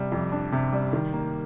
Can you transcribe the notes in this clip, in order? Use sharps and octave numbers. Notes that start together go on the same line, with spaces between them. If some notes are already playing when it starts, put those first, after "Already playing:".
Already playing: C3 G3
F2
D4
C3
G3
D#3
A#3